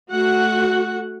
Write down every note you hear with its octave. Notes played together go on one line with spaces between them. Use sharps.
A3 F#4 F#5